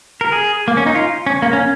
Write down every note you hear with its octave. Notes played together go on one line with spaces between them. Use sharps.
A#4
G#4
A#3
C#4
D#4
F4
C#4
A#3
C#4